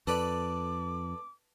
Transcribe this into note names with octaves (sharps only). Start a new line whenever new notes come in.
F2 A4 B4 D5 D6